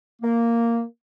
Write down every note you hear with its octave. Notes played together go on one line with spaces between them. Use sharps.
A#3